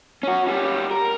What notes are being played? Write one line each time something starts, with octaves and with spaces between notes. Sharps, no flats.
C#4 F#4
G3 C#4
A#4